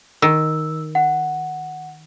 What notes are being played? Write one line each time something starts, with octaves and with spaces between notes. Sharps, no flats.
D#3 E6
F#5